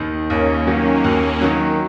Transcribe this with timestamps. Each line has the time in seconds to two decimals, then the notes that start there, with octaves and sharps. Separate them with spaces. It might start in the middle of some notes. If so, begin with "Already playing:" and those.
Already playing: D#2 D#3
0.30 D#2 A#3 C#4
0.67 D#3 F#3 A#3 C#4
1.04 D#2
1.41 D#3 F#3